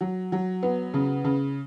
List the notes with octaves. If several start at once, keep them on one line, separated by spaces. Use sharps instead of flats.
F#3
F#3
B3
C#3
C#3